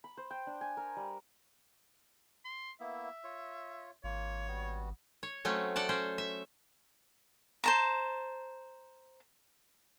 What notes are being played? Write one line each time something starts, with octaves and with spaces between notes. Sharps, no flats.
B5
C5
G5
D4
G#5
A#4
G3
C6
A#3 B3 E4 E5
F4 C#5
G#1 A#3 F4 C#5
G3 B3 F#4
C#5
F#3 A3 C4 C#4
A4 D5 F#5 A5
C#4 C5
E5
C5 A5 A#5